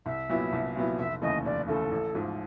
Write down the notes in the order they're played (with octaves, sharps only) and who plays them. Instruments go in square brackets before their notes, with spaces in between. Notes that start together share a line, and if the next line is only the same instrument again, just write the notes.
[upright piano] C2 [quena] E5
[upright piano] A#2 F#3 B3 E4
C2
A#2 F#3 B3 E4
[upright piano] F1 [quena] E5
[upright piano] D#2 C#3 E3 A3 [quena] D#5
[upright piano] F1 [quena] D5
[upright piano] D#2 C#3 E3 A3 [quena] A4
[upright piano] A1
G#2 F3